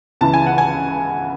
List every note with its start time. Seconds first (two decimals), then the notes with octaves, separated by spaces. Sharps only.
0.21 C#2 C#3 E3 A5
0.34 G#5
0.46 F#5
0.58 G#5